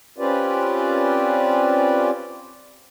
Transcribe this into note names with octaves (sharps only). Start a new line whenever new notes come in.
C4 C#4 F4 G4 B4 D5